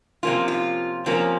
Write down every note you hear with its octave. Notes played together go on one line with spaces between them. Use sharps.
C3 F3 A#3 C#4 F4
F4
C3 F3 A#3 C#4